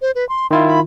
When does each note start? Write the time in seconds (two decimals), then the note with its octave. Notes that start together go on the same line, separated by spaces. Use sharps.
0.02 C5
0.15 B4
0.29 C6
0.51 D#3 E4 F4 C6
0.67 B5